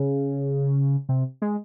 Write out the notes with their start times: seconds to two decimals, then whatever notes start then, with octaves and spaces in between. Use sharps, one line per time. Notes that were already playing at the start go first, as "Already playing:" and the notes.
Already playing: C#3
1.09 C3
1.42 G#3